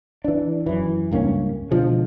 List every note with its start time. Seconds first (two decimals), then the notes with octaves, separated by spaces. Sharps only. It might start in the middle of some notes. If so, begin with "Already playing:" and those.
0.24 E3 D4
0.66 F#2 E3
1.11 C#2 G2 A#3 C#4
1.71 B2 D3 F3 G#3